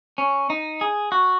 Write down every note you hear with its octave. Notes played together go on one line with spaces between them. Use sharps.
C#4
D#4
G#4
F#4